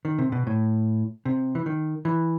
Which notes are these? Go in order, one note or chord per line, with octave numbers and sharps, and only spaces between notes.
D#3
C3
B2
A2
C3
E3
D#3
E3